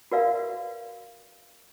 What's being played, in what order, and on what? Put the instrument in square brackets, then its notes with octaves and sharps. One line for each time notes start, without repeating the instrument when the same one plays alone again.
[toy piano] F#4 A#4 B4 D5 E5 F5